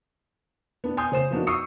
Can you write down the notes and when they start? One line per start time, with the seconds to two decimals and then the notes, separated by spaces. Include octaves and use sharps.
0.84 B3 D4
0.97 G#5 C6 D#6 G6
1.12 C#3 C5 E7
1.31 F3 A#3 B3 D4 D#4 F#4
1.47 C#6 D#6 E6 C7 C#7